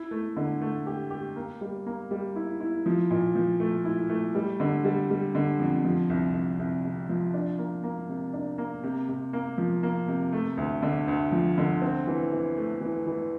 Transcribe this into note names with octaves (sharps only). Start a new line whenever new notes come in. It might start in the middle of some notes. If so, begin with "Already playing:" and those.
Already playing: E4
A3
D3
A3
G4
G4
A#3
G3
A#3
G3
E4
E4
F3
A#2
F3
A3
E4
A3
G3
D3
G3
G3
D3
F2
F3
C2
C2
C2
C3
F3
D4
A#3
A#3
C3
D4
A#3
C3
C3
A#3
F3
A#3
C3
A3
D2
D3
D2
F3
D3
C4
E3
E3
A3
E3
E3